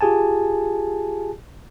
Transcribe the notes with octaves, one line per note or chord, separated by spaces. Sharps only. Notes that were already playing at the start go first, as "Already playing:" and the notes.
F4 G4 G#4 G#5 A5